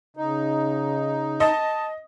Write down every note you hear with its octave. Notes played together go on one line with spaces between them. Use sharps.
C#3 D#4
D#5 A5